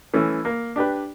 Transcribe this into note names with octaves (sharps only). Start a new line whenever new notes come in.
E3 A3 C#4
A#3
D4 G4 B4